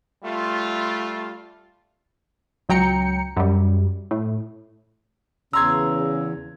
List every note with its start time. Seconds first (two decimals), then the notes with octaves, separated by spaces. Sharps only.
0.24 G3 A3 F4
2.69 C#2 F#3 G5 A#5 C#7
3.36 F#2 G3
4.11 A2
5.53 E2 C#3 A#5 C6 E6 G#6